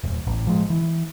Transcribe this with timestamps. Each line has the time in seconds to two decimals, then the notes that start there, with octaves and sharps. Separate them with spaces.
0.04 D#1
0.27 A1
0.47 F3 G#3
0.70 E3